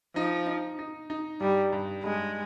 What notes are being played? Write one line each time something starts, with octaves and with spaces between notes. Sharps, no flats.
F3 D#4
D#4
D#4
D#4
G2 G3
G2
G2 G#3